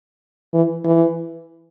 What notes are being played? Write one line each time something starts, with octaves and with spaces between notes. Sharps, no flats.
E3
E3